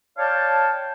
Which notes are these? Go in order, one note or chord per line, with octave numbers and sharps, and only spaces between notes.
C#5 D5 F5 G5 A5